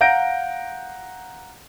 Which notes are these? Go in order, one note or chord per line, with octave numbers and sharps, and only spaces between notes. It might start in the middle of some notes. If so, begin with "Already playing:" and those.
F5 F#5 A#5 G6 A#6 D7